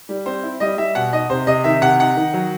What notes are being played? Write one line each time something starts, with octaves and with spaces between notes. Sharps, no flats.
G3
C4 C5
E4
G3 D#5
G3 E5
B2 F#5
D#4 D#5
C3 C5
C3 D#5
D#3 E5
C3 F#5
D#4 F#5
D#3
F#3